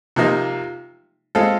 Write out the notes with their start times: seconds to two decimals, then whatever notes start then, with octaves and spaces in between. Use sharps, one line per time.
0.16 C3 F3 A#3 D#4
1.35 G#3 C4 F4 A4